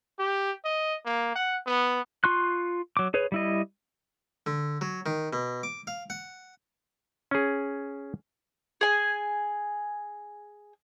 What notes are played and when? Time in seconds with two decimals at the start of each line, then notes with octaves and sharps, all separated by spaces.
0.19 G4
0.65 D#5
1.05 A#3
1.35 F#5
1.66 B3
2.24 F4 C6 C#6 F#6
2.97 F#3 D6
3.14 G#4 B4 C#5
3.32 G3 E4 D#5
4.46 D3
4.81 F#3
5.06 D#3
5.33 B2
5.63 D6
5.87 F5
6.10 F#5
7.31 C#4 G#4
8.81 G#4 G#5